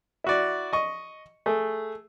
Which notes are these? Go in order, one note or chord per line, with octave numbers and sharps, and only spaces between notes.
E4 F#4 D5
D#5 C#6
A3 G#4